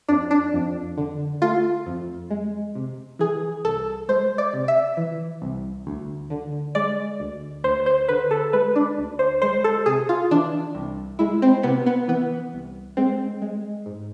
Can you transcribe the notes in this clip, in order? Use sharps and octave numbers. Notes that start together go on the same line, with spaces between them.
F2 D4
D4
F2
D3
A3 F4
F2
G#3
C3
E3 G#4
C2 A4
G#3 C5
D5
C3
E5
E3
C2
D2
D3
G#3 D5
D2
D2 C5
C5
D3 B4
A4
G#3 B4
D4
D2
C5
G#3 C5
A4
C3 G#4
F4
E3 D4
C2
G#3 E4
C4
C3 B3
B3
E3 B3
C2
G#3 C4
G#3
G#2